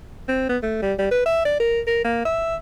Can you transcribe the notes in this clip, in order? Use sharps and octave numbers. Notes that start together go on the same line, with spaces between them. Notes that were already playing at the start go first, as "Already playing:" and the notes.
C4
B3
A3
G3
G3
B4
E5
D5
A#4
A#4
A#3
E5